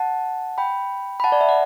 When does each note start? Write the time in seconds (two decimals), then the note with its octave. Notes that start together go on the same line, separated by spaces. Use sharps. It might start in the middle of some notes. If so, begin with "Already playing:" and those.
Already playing: F#5 A5
0.58 G5 B5
1.20 B5
1.24 F#5 A5
1.32 D5
1.41 E5
1.49 F#5